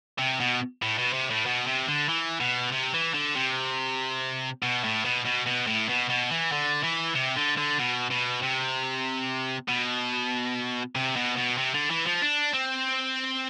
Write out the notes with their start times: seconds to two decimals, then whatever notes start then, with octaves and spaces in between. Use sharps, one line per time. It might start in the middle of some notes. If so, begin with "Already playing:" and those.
0.19 C3
0.40 B2
0.82 A2
0.98 B2
1.13 C3
1.30 A2
1.46 B2
1.67 C3
1.88 D3
2.09 E3
2.41 B2
2.72 C3
2.94 E3
3.14 D3
3.35 C3
4.62 B2
4.84 A2
5.05 B2
5.25 B2
5.46 B2
5.67 A2
5.89 B2
6.10 B2
6.31 E3
6.52 D3
6.84 E3
7.15 C3
7.37 D3
7.57 D3
7.79 B2
8.10 B2
8.42 C3
9.69 B2
10.95 C3
11.16 B2
11.37 B2
11.58 C3
11.74 D3
11.90 E3
12.06 F3
12.22 D4
12.53 C4